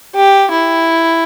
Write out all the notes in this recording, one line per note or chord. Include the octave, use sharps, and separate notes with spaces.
G4
E4